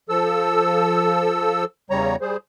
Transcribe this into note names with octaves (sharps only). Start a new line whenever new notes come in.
F3 A4 E6
E2 C#3 G3 C#5 A#5
G3 G#4 C5